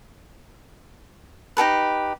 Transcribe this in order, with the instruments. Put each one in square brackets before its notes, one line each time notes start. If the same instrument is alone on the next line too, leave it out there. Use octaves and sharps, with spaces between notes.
[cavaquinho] D#4 G4 A4 B4